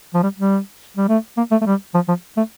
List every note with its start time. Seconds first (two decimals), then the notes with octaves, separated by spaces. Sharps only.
0.14 F3
0.23 G3
0.37 G3
0.97 G3
1.09 A3
1.37 A#3
1.51 A3
1.62 A3
1.66 G3
1.95 F3
2.08 F3
2.37 A3